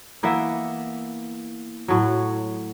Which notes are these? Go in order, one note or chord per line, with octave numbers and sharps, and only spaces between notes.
E3 A#3 B3 E5
A2 F#3